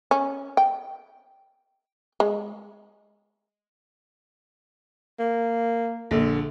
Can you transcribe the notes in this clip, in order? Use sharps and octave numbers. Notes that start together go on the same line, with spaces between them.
C#4
G5
G#3
A#3
A#1 D3